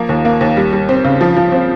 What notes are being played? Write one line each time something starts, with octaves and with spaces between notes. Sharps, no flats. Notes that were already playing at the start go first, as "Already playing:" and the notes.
Already playing: F3 A#3
D#2
A#3
D#2
G3
G3
C4
C#3
F3
F3
C4